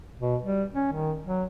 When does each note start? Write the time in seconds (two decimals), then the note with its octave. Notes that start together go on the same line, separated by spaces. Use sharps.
0.20 B2
0.44 G3
0.74 C#4
0.93 D#3
1.26 F#3